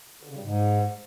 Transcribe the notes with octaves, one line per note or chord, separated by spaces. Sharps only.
D3
C#3
G3
G#2